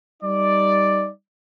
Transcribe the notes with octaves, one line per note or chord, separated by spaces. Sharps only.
G3 D#4 D5